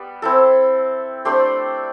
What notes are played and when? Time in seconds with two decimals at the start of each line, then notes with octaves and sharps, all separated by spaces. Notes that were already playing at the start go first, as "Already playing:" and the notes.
Already playing: G3 B3
0.22 C4 E4 A4
1.25 A3 D4 G4 C5